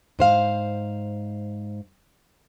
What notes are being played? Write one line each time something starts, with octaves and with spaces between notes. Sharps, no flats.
G#2 C5 F5